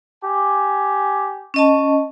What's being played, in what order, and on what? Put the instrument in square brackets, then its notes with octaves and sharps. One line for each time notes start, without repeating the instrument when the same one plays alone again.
[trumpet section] G4 G#5
[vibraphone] C#4 D#5 A5